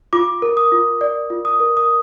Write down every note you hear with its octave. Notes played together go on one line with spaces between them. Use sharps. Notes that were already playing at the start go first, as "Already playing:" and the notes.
F4 D6
A#4
D#6
F4
D5
F4
D#6
A#4
D#6